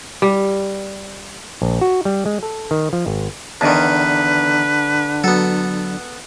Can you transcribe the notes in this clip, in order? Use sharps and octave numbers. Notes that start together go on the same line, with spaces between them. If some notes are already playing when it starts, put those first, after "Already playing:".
G3
A#1
F#4
G3
G#3
A4
D#3
F3
G#1
E2 D3 D#3 B4 D5 D#5 A5
F#3 B3 A4